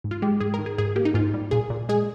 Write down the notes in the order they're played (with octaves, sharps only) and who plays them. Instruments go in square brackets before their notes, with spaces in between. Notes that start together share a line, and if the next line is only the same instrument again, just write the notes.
[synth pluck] G#2
F4
G#3 G4
G#2 G#4
D#3 A#4
G#4
G#2 G#4
A#3 G4
D#4
G#2 F4
G3
A#2 G#4
A#2
G#3 G#4